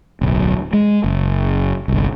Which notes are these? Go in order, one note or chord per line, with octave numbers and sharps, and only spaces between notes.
D1 B1
G#3
F#1
G1 C2